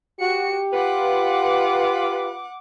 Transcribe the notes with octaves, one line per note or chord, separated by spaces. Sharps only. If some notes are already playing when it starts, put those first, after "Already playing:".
F#4 G4 C#7
F4 B4 F#5 D6